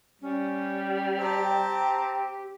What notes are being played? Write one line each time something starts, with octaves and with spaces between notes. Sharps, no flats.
G3 C#4
C4 G4 G5 A5 A#5